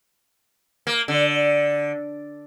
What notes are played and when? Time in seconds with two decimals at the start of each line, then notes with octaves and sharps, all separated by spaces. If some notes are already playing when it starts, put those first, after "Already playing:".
0.87 A#3
1.08 D3